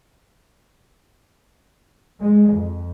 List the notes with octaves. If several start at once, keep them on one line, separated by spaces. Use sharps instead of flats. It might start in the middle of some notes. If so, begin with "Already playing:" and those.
G#3
F2